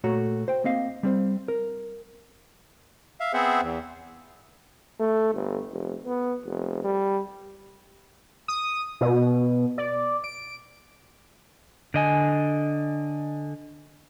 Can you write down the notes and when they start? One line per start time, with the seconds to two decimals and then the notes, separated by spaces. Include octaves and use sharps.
0.04 A#2 A3 F#4 C#5 A#5
0.48 C5 G5
0.64 A#3 C4 D#5 F5
1.03 G3 C4 C5
1.48 A#4
3.20 E5 F5
3.33 B3 C4 G#4 C5 E5 F#5
3.62 E2
5.00 A3
5.34 G1
5.71 F1
6.06 B3
6.46 F1
6.84 G3
8.48 D#6
9.01 B2
9.78 D5
10.24 D7
11.94 D3 D#5 G#5